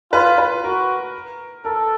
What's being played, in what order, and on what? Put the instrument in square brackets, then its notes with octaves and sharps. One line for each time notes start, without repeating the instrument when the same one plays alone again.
[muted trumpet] F4 [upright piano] B4
[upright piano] B4
[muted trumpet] F#4 [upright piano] A#4
[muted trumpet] A4 [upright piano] A#4